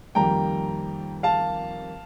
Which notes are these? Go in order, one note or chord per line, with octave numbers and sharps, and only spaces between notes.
F2 D#3 G3 A#3 G5 A#5
F5 A5